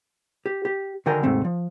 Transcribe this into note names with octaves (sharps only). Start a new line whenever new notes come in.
G4
G4
D3 D#3 F#4 A#4 G5 G#5
D#2 G#2 C3 A3 C4
F3